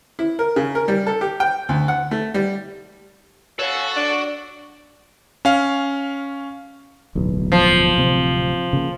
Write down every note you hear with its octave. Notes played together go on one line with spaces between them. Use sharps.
E4
A#4
C#3
A#4
G3
A4
G4
G5
D2
F#5
A3
G3
F#4 A4 C#5 F5
D4 D5
C#4 F5
D1 B1 E2
F3
D1 C3 C4
C#3 A#3